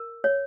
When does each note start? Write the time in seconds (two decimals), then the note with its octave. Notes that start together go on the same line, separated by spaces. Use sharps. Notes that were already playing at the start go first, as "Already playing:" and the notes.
Already playing: A#4
0.24 C#5